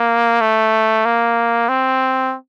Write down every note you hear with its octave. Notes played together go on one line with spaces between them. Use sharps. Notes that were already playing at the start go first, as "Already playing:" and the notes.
Already playing: A#3
A3
A#3
C4